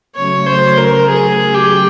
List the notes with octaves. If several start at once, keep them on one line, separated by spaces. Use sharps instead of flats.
C#3 F#3 A3 C#5
C5
A#4
G#4
G4